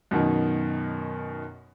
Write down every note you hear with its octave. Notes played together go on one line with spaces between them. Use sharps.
F#2 B2 D#3